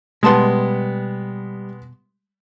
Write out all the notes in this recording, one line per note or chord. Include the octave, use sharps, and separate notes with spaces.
B2 G3 G#3 B3 A5 C6